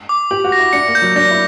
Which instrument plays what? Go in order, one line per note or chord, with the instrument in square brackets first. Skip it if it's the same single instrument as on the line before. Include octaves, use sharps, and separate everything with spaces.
[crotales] D6
[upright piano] G4 [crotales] F#7
[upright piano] F#4
[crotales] A#6
[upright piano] E4
[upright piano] D4 [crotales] C#7
[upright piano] A#3
[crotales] G6
[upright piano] F#3
[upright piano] D4 [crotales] A#6
[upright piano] E4